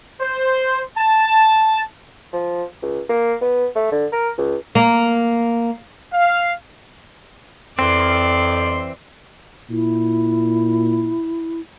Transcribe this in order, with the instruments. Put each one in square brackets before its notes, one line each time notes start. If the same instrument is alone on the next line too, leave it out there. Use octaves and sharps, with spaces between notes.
[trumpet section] C5
A5
[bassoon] F3
C#2
A#3
B3
A3
D3
A#4
C#2
[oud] A#3
[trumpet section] F5
[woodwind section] F2 [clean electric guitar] E3 C4 [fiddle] D5 [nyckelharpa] C6
[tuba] A#2 [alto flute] E4